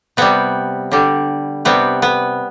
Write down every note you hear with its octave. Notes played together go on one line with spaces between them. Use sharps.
C3 G3 B3
D3 G3
C3 G3 B3
B3